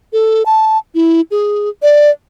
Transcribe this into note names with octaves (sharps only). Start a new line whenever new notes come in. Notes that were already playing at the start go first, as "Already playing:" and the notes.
A4
A5
E4
G#4
D5